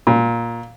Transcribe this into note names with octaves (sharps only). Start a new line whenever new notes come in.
A#2